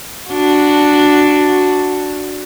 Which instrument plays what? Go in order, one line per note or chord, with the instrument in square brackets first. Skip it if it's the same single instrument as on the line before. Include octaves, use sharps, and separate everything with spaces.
[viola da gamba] D4 F#4